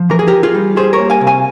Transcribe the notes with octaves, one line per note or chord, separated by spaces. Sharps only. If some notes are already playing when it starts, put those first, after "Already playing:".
Already playing: F3
E3 A#4
G#4
E3 G4 A#4
F4 G#4
G3
G3 G#4 C5
A#4 C#5
A#3
F5 G#5
C3
F5 G#5